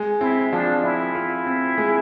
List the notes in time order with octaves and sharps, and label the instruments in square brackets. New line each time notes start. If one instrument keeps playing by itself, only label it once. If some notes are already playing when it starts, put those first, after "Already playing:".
Already playing: [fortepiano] G#3
[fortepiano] C4 [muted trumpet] E4
[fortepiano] F3 [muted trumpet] D4
[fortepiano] C4 [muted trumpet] E4
[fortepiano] F4
C4
G#3